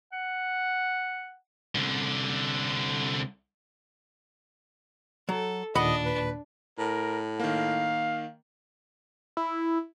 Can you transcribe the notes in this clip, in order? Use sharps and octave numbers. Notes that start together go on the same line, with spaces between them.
F#5
C2 D3
F#3 A4
D#2 A#2 D4 D#5 F#5 B5
B4
A2 A#4
D#3 A#3 F5
E4